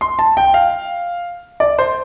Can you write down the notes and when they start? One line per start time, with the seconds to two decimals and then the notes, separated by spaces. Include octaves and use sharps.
0.01 C6
0.19 A5
0.37 G5
0.54 F5
1.60 D5
1.79 C5